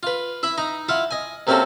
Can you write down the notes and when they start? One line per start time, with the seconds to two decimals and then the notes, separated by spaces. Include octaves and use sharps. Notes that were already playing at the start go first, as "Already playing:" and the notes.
0.03 F4 B4
0.43 E4 E5 B5
0.58 D#4 D#5 A#5
0.89 E4 F4 F5 F#5
1.11 D#5 G#5
1.47 C3 A#3 C4 C#4 F#4 A4